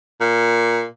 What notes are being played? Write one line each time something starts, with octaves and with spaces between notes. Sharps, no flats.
A#2